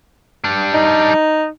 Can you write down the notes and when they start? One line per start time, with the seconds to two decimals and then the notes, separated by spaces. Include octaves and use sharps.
0.44 G3 D4
0.74 D#4